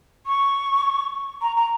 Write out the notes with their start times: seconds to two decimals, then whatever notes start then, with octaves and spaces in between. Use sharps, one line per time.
0.26 C#6
1.42 A#5
1.56 A#5